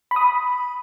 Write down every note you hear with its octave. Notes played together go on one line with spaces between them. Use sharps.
B5
D#6
B5